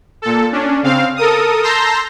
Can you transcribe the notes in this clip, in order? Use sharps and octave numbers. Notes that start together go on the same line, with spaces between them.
A#2 A4
C#4 D4
C#3 C4 F5
A4 A#4 D#6
A5 A#5 C6 E6 G6 A#6